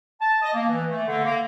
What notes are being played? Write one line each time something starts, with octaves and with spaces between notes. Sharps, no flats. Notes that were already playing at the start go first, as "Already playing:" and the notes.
A5
D#5
A#3
E3
A3
D3
A#3